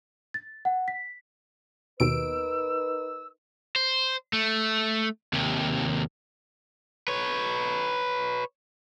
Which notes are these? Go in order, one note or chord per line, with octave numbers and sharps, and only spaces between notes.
A6
F#5
B6
D#2 B2 D#4 A#4 B4 E6 D7
C5
A3
D#2 C3
B4 C#5